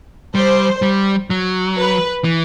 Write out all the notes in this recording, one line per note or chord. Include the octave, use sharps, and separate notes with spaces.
G3 C5
G3
F#3
B4
E3